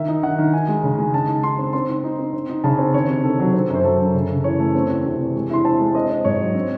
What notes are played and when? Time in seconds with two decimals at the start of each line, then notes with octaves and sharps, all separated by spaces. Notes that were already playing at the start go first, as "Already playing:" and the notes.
Already playing: D#3 E5
0.08 D#4
0.23 D#3 F#5
0.38 D#3
0.53 D#4 G#5
0.68 G#3
0.83 C#3
0.98 G#3
1.14 C#3 A5
1.28 D#4
1.43 D#4 C6
1.58 C4
1.73 C4 C6
1.89 D#4
2.04 D#4
2.18 C4
2.33 C4
2.49 D#4
2.64 C#3 A5
2.79 C4
2.94 D#3 C#5
3.09 C3
3.24 D#3 A4
3.40 F#3
3.54 C4
3.69 F#2
3.75 C5
3.84 F#3 A4
3.99 F#2
4.14 C#3
4.29 C#3
4.44 E3 C#5
4.59 A3
4.75 C4
4.89 E2
5.05 C3
5.19 E2
5.35 G#3
5.50 E4 C6
5.65 C4 A5
5.80 G#3
5.95 C4 D#5
6.10 C4
6.25 G#2 C#5
6.40 F#3
6.54 C4